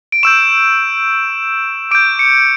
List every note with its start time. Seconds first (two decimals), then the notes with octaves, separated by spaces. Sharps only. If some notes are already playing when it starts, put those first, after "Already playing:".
0.12 D7
0.23 C#6 E6 G6 E7
1.91 D6 G6 D7
2.19 C#7